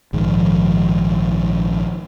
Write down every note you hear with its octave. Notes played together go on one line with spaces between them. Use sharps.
A#1 G#2 D#3 F3